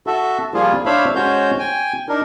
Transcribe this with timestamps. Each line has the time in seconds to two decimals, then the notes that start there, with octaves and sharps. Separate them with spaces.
0.07 F#4 A4 E5
0.54 F3 G3 A#3 F4 G#4
0.86 D4 C5 C#5 E5 F5 B5
1.15 G#3 C#4 F#4 C5 C#5 G6
1.59 G5 G#5
2.09 D4 D#4 A#4